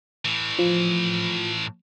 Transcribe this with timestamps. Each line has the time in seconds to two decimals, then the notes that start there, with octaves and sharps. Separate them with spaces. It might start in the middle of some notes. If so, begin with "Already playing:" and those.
0.25 A2 E3
0.59 F3